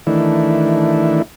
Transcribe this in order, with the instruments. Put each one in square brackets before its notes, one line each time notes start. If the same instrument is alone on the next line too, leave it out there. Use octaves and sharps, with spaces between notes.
[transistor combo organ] D#3 E3 A3 D4 E4